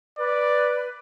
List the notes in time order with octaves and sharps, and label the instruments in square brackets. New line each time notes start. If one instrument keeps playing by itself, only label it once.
[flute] B4 [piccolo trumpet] D5